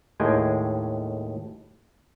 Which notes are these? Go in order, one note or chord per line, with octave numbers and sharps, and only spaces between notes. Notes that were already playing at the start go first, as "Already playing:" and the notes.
D#2 A2 G#3 G5 G#5